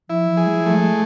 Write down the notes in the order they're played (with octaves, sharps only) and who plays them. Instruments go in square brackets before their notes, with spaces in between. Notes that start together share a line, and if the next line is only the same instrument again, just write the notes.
[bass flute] F3 [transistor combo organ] E4
[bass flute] F3
[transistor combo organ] G#4
[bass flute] G#3
F3
[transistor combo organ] A3
[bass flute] G#3